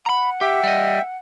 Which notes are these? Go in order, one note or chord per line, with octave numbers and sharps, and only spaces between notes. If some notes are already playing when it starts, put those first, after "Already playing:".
F#5 A#5 B5
G4 E5 G5
G3 D#5